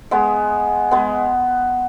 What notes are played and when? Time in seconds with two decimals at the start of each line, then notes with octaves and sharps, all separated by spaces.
0.11 G#3 B3
0.91 G#3 B3